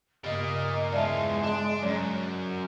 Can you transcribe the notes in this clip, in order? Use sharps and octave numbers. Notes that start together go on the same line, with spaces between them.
G2 C#3 A#3 D5 D#5
E2 G#3 F4 D5 E5 A5
D4
F#2 C#5 D5